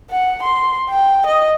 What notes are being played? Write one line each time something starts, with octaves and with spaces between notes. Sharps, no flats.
F#5
C6
G5
D#5